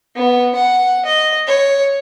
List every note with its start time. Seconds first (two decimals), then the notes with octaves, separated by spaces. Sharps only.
0.15 B3
0.55 F#5
1.05 D#5
1.47 C#5